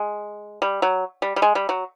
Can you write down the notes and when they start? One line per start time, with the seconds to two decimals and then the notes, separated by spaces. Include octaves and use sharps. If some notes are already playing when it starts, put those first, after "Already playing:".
Already playing: G#3
0.62 G3
0.82 F#3
1.22 G3
1.36 G3
1.42 G#3
1.55 G3
1.69 F#3